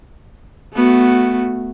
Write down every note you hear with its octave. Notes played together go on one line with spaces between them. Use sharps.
A3 B3 F#4